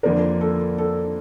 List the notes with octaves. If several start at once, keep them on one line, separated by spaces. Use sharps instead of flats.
F2 D3 F3 A#3 D4 A#4
A4
A4